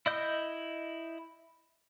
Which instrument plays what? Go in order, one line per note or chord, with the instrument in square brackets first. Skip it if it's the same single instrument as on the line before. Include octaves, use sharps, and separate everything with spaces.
[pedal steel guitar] E4 D#5 G6